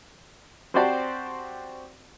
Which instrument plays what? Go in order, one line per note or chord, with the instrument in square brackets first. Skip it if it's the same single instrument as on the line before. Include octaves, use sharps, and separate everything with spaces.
[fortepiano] C4 F#4 G4 C5 D5 A5